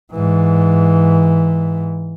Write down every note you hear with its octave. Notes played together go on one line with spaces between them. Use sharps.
G#2 E3